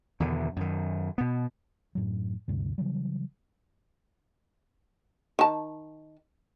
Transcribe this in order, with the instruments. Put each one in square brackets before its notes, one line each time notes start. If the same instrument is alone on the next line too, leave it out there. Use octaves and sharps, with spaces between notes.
[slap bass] E2 B2 D3 D#3
F#2 D#3
B2 B3
[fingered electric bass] F#2 A2 F#3
D2 G2 C3
C#3 E3 F#3 G3
[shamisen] D#3 A5